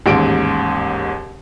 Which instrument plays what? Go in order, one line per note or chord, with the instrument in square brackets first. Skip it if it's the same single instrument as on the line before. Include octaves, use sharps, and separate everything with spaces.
[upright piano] A1 D#2 G#2 D7